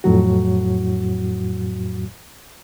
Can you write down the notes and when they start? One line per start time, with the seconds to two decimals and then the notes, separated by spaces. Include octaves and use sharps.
0.04 F2 A2 F#3 F#4